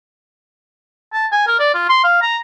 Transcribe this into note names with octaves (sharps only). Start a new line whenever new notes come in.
A5
G#5
A#4
D5
F4
C6
F5
A#5